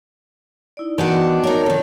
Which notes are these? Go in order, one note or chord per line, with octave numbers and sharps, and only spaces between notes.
D#4 E4 D5
D#3 E3 B3 D4 F#4 F#5
D#4 A#4 C#5
C3 D#3 F4 A4